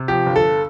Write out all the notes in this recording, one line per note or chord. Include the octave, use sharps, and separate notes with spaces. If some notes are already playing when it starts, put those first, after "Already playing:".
Already playing: C3
F3 G4
G1
A4